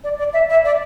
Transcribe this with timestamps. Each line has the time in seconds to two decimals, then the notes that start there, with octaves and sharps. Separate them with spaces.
0.04 D5
0.18 D5
0.33 E5
0.49 E5
0.64 D5